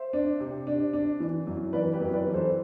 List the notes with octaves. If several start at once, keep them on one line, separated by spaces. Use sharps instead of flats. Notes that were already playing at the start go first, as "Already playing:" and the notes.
Already playing: C5 E5
D4
C3
D4
D4
E3
F#2
E3 B4 D5
G4 B4
F#2
B4 D5
E3
A4 C5